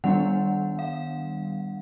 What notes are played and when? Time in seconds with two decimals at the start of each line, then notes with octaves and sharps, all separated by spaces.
0.04 D#3 G3 B3 D4 F#5
0.79 F5